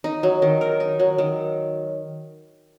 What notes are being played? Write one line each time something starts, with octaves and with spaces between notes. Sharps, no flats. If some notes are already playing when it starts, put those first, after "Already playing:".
D#4
F#3
D#3
A#4
D#4
F#3
D#3